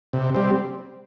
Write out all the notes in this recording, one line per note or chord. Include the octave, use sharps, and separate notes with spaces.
C3
G3 C4